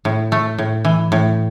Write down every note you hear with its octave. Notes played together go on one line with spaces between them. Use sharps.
A2
A3
A2
E3
A2